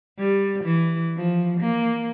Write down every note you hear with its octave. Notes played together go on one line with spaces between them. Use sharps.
G3
E3
F3
A#3